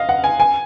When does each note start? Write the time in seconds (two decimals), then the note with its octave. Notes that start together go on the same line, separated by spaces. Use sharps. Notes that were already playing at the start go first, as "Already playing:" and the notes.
Already playing: D#5 F5
0.09 F#5
0.24 G#5
0.40 G#5